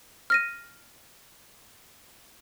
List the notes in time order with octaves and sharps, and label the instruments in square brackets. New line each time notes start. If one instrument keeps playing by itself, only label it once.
[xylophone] F6 A#6 D#7